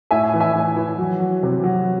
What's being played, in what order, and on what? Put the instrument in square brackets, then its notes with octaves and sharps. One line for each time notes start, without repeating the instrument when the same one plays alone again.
[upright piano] A2 E5 G#5
E3
E5 G#5
A2
E3
F#3
F#3
C3
F#3